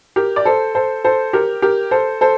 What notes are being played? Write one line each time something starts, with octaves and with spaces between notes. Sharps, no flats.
G4 A#4
D5
A4 C5
A4 C5
A4 C5
G4 A#4
G4 A#4
A4 C5
A4 C5